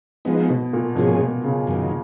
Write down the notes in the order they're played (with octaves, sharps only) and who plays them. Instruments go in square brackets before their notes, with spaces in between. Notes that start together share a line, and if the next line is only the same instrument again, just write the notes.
[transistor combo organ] F3 G#3 B3 D#4
[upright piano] B2
A#2
[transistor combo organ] G#2 F3 A#3 C#4 G#4 [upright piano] B2
[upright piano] B2
C#3
[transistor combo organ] F#2 D#3 A#3